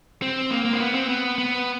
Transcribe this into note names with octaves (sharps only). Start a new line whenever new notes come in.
C4
A#3
A#3
C4
B3
C4
B3
B3